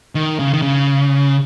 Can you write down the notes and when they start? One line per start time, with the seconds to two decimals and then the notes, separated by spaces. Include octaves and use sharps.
0.15 D#3
0.39 C#3
0.53 D#3
0.62 C#3